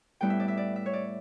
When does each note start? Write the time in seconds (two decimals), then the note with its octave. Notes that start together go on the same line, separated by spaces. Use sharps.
0.21 A2 G3 B3 E4 G5
0.30 E5
0.40 D5
0.48 E5
0.57 D5
0.76 E5
0.86 C#5
0.93 D5